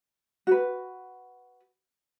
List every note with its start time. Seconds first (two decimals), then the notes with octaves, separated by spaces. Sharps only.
0.47 F#4 B4